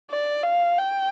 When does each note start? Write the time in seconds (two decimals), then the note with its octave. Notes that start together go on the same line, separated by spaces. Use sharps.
0.11 D5
0.43 F5
0.77 G5